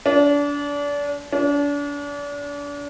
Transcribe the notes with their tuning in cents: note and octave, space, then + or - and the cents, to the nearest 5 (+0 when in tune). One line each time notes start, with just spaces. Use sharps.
D4 -30
D4 -35